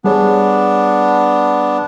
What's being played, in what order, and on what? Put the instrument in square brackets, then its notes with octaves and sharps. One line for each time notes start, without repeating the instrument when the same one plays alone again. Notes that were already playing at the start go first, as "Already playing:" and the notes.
[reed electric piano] G3 G#4 C#5 [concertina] B3 D4